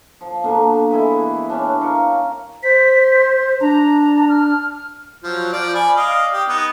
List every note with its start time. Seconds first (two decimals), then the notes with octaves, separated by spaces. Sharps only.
0.21 F3
0.44 B2 D3 A#3
0.91 E3 G#3 E4
1.48 C#4 D4 D5
1.80 A#4 F5 C#6
2.63 C5 B6
3.61 D4 A#5
4.29 F6
5.24 F3 F#3
5.53 F3 D5
5.75 D5 G#5 B5
5.96 D5 D#5 F5
6.33 G4 D#6
6.49 B3 D#4